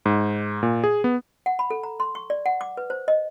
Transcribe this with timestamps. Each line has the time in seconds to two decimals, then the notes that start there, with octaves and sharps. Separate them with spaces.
0.05 G#2
0.63 A#2
0.84 G#4
1.04 B3
1.46 F#5
1.59 B5
1.70 A4
1.83 A#5
2.00 C6
2.15 C#6
2.30 D5
2.46 F#5
2.61 D6
2.77 B4
2.90 C5
3.08 D#5